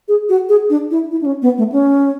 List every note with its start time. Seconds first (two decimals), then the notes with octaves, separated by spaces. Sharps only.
0.08 G#4
0.29 F#4
0.49 G#4
0.70 D4
0.91 E4
1.11 E4
1.22 D4
1.26 C#4
1.42 B3
1.58 A3
1.72 C#4